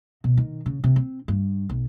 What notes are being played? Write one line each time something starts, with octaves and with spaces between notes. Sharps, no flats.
B2
D#3
C#3
C3
C4
G2
B1